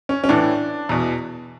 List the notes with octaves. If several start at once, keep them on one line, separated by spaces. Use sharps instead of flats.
C#4
C#4
A2 E3 D4
E2 B2